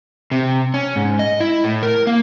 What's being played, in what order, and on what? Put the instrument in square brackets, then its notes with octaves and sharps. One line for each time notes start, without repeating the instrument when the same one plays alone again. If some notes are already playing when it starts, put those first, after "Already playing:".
[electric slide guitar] C3
C#4
G#2
D#5
E4
A2
A#4
A#3